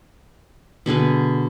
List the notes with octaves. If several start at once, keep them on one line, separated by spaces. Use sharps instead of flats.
B2 D3 G#4 B4